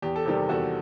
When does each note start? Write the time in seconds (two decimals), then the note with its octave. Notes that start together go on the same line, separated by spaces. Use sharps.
0.02 E2 G4
0.16 A4
0.26 C3 D#3 G3 G4
0.49 E2 F#4 A4